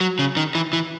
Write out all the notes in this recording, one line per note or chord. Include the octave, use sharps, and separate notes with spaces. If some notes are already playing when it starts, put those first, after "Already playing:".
F#3
C#3
D#3
E3
E3